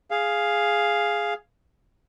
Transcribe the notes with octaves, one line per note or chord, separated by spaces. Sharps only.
G#4 F5